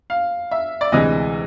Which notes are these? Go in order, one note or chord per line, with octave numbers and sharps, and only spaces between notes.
F5
E5
D5
D2 C3 E3 G#3 D#5